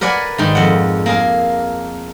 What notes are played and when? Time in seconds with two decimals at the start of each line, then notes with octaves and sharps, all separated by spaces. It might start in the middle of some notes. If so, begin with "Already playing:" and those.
0.01 A#4 B4 D5 F#5 G#5
0.38 G#2 D#3
0.55 F2 F#5
1.06 A#3 G#4 A#4